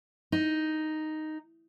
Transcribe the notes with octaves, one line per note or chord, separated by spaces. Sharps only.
D#4